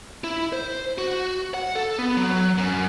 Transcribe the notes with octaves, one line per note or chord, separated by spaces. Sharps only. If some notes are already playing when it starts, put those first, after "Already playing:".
E4
C5
F#4
F#5
A4
B3
F#3
F#2